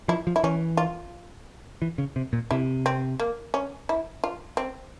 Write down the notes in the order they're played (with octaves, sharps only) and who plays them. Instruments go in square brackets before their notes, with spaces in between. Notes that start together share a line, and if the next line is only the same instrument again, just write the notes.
[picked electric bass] F3 [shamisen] E4
[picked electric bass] F3
[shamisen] E4
[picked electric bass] E3 [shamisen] C#4
[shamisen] F4
[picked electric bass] E3
C#3
C3
A#2
[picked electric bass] C3 [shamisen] E4
[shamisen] C4
A#3
C#4
E4
F4
C4